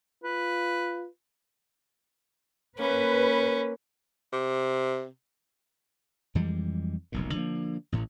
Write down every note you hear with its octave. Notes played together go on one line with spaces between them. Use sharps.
F4 B4
A#3 C#4 B4
C3
F2 E3 G3 G#3
F1 B1 A#2
D3 F3 G3 A#3
A1 A2